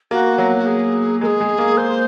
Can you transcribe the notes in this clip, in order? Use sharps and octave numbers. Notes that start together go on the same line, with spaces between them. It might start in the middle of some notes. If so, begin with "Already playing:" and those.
A#3 F#4
F#3
F#4
G#4
G#3 G#4 A#4
G#3
A#3
C5